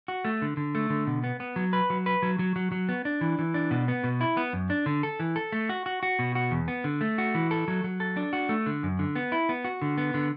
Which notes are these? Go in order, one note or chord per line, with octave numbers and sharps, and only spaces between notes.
F#4
A3
D3
D3
A3
D3
B2
B3
B3
F#3
B4
F#3
B4
F#3
F#3
F#3
F#3
B3
D4
E3
E3
D4
B2
B3
B2
E4
B3
F#2
D4
D3
A4
E3
A4
A3
F#4
F#4
F#4
B2
F#4
E2
B3
D3
A3
F#4
E3
A4
F#3
F#3
A4
D4
F#4
A3
D3
F#2
D3
B3
E4
B3
F#4
D3
B3
D3